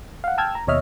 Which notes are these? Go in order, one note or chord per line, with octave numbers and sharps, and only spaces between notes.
F5 F#5
G5 A5 E6 F6 G#6
A#5
D#2 B2 C#5 D#5 E5 F6